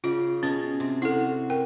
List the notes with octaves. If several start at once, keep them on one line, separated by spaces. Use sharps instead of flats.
C#3 F4
B2 C#4 G#4
C3
E4 F#4 A4
A#4 G5